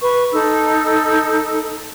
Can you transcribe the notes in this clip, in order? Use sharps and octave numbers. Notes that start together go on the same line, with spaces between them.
B4 C#6
D#4 A4 E6